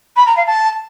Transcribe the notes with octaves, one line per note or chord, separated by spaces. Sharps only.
B5
A#5
F5
A5